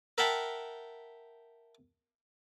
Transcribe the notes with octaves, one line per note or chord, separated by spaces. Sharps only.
A#4 E5 F#5 G5 A5 B5